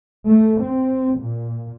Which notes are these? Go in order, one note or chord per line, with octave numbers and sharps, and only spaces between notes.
A3
C4
A#2